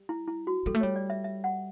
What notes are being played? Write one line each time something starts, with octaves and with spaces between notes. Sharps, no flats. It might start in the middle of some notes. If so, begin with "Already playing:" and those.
Already playing: G3
E4
E4
F#4
G3 A4
A3
G3 C#5
D5
E5
E5
F#5